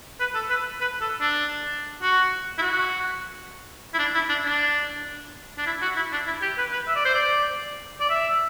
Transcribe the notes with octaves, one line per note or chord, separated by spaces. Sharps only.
B4
A4
B4
B4
A4
D4
F#4
E4
F#4
E4
D4
E4
D4
D4
D4
E4
F#4
E4
D4
E4
G4
B4
B4
E5
D5
C5
D5
D5
E5